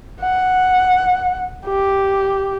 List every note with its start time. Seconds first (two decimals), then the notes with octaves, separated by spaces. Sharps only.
0.21 F#5
1.66 G4